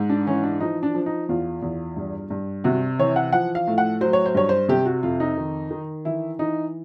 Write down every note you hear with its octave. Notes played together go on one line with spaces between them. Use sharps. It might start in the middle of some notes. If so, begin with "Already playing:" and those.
Already playing: G#2
D4
E3 C#4
D4
F3 D#4
D4
F3
D#4
E2 F4
E2
G2
G2
C3 F#4
E3 C#5
F#5
F3 F#5
F5
A2
F#5
F#3 C5
C#5
C5
G2 C#5
C5
C3 G4
F#4
F2 F4
D#4
D#3
D#3
E3 E4
E3 D#4